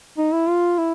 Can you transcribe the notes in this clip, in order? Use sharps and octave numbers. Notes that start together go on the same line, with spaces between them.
D#4
E4
F4
E4